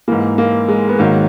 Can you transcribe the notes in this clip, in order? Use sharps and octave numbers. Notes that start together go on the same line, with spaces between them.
G#2 E3 A#3
A#3
G#3
B3
G#2 D#3 F#3 A#3